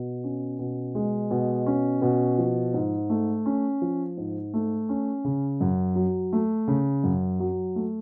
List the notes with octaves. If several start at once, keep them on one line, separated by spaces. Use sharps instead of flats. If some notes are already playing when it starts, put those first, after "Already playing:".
Already playing: B2
C#4
B2
G#3
B2
C#4
B2
F3
G#2
A3
C#4
F3
G#2
A3
C#4
C#3
F#2
F#3
A3
C#3
F#2
F#3
A3